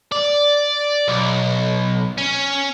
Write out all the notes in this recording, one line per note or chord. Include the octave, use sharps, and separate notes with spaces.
D5
B1
C#4